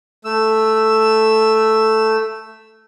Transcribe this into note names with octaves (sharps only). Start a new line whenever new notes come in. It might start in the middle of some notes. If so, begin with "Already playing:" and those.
A3 E6